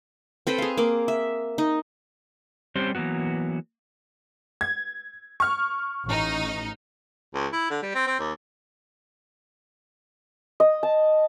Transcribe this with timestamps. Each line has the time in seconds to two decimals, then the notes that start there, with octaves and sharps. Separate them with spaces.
0.47 C4 A4 B4 G5
0.58 G#4 F5
0.77 A#3 D6
1.08 E5
1.58 D#4
2.76 G3 C4 C#4 G4 C5
2.95 E3 F#3 A#3 B3 F#4
4.61 G#6
5.40 C#6 F6
6.07 A1 D#4
7.34 C#2
7.53 E4
7.70 D3
7.83 G3
7.95 C4
8.07 C4
8.19 D#2
10.60 D#5
10.83 A5